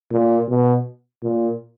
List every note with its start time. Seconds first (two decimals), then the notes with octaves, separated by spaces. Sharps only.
0.12 A#2
0.49 B2
1.23 A#2